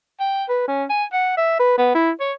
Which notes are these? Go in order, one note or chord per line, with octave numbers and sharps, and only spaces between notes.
G5
B4
C#4
G#5
F#5
E5
B4
B3
E4
C#5